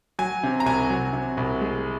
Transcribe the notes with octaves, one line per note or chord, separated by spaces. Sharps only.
F#3 G#5
C3
A#5
C2 G#5
F#3
C3
C2
G#3